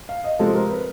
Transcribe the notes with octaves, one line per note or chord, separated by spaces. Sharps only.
F5
D#5
C3 F3 G#3 C4 A4
A#4
B4